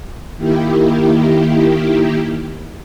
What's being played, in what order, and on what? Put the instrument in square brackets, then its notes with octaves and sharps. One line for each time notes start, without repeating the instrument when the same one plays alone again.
[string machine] D#3 A#3 E4 G4